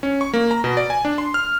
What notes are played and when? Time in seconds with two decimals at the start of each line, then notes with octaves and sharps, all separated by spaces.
0.03 C#4
0.21 C#6
0.34 A#3
0.51 A#5
0.64 B2
0.77 D5
0.90 G#5
1.05 D4
1.18 C6
1.34 F6